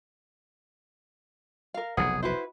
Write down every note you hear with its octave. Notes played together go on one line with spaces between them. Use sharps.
A#4 F5
F1 B1 C3 G#4 F#5
E4 F#4 B4 C5